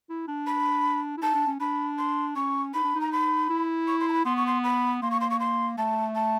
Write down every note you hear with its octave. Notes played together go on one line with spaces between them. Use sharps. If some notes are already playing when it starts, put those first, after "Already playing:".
E4
D4
B5
E4
D#4 A5
D4
C#4
D4 B5
C6
C#4 C#6
D#4 B5
D4
D#4
A#5
B5
E4
C#6
C6
A#5
B5
B3 C6
C#6
C6
B5
A#3 C6
C#6
C6
C#6
C6
A3 A5
A5